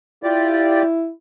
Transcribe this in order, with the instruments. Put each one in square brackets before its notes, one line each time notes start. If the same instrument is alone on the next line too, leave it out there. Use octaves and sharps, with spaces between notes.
[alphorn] E4 [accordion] F4 G4 D5